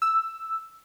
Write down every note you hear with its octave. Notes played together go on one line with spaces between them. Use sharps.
E6